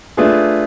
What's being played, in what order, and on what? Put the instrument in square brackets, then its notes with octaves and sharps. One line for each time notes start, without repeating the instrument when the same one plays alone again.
[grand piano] A3 D4 F4 G#4 B4